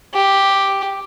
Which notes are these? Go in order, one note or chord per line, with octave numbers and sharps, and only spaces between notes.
G4